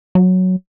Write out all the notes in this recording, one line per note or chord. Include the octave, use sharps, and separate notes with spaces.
F#3